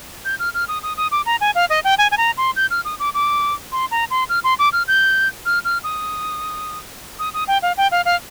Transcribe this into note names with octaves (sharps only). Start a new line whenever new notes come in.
G6
F6
F6
D#6
D#6
D#6
D6
A#5
G#5
F5
D#5
G5
G#5
G#5
A#5
C6
G6
F6
D#6
D6
D6
C6
A#5
C6
F6
C6
D6
F6
G6
F6
F6
D#6
D#6
D#6
G5
F5
G5
F5
F5